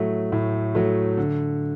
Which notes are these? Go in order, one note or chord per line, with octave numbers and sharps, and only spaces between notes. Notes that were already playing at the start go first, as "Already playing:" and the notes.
Already playing: A2 F#3 A3
A2
F#3 A3
D3